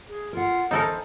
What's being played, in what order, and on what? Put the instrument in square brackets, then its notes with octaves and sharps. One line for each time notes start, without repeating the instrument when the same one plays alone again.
[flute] G#4
[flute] F4 [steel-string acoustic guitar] A#4 F#5
[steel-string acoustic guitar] E2 F5 G#5 [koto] D#4 A4 A#4 [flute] C5